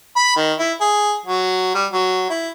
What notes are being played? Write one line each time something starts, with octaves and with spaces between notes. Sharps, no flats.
B5
D#3
E4
G#4
F#3
G3
F#3
E4